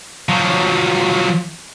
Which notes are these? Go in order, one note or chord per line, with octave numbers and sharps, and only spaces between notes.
F3 F#3